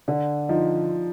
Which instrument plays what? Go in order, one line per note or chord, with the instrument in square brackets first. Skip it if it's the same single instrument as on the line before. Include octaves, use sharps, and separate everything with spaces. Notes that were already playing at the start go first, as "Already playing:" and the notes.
[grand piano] D3 [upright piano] D4
[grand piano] F3 [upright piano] D#4